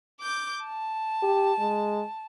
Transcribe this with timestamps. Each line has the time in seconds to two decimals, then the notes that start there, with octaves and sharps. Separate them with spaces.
0.21 D6 G6
0.65 A5
1.22 G4
1.59 G#3